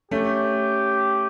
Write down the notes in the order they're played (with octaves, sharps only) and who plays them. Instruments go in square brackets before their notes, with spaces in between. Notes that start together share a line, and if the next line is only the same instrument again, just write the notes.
[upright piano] A3 C#4 [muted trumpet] G4